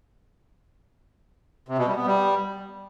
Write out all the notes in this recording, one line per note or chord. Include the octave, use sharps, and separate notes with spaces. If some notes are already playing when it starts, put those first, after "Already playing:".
C3
B2
G3
B3
G3